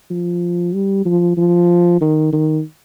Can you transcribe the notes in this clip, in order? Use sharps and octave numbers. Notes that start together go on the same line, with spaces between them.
F3
G3
F3
F3
D#3
D#3